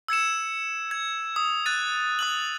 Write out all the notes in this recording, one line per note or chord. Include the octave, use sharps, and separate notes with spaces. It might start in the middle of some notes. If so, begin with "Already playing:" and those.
E6 G#6 C#7 E7
G#6
D#6
F#6 A6 D#7
D#6 F#6 F#7